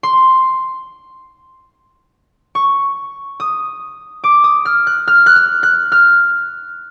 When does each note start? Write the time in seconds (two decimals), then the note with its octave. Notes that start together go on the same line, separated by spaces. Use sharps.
0.03 C6
2.55 C#6
3.40 D#6
4.24 D6
4.44 D#6
4.65 F6
4.87 F#6
5.08 F6
5.26 F#6
5.36 F6
5.63 F#6
5.92 F6